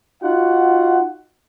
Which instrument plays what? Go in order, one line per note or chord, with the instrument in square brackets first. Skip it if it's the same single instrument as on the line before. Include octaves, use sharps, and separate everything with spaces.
[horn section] D#4 F4 F#4 F#5